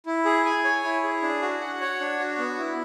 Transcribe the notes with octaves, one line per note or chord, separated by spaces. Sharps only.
E4
G#4
G#5
C#5
E4
G#4
D4
F#4
F#5
C#5
D4
F#4
B3
E4